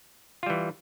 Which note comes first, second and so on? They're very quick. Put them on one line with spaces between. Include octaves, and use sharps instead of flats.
F4 G3 E3